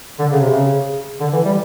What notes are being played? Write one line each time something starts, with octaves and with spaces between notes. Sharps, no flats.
D3
C#3
C3
C#3
D3
E3
G3